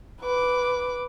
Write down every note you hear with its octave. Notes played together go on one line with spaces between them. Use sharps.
B4 D6